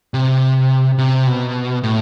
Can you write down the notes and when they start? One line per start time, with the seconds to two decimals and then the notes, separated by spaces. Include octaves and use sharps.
0.14 C3
0.98 C3
1.27 B2
1.83 A2